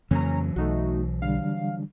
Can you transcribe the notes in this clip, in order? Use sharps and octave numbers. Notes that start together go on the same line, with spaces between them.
F2 C#3 E3 F#3 A#3 C#4 A#5
B1 A3 D#4 F#4
D3 G3 D4 F5